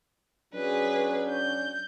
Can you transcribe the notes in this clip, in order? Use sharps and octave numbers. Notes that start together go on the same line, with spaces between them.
F#3 C#4 D4 G#4 B4
G6